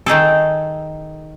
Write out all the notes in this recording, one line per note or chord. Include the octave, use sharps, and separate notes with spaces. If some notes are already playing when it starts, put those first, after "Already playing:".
D#3 D#4 G#4 A4